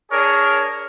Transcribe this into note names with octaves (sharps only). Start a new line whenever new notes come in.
D4 G#4 A#4 C#5